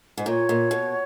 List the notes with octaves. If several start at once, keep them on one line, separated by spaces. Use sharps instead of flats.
G#2
A#2 C#5
A#2
B2